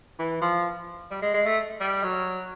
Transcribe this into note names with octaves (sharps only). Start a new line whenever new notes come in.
E3
F3
G3
G#3
G#3
A3
G3
F#3